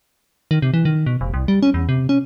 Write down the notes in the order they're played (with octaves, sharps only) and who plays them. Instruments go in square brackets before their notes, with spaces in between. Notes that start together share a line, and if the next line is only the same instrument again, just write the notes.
[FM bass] D#3
C3
E3
D#3
B2
F1
C2
G3
C#4
E2
C3
C#4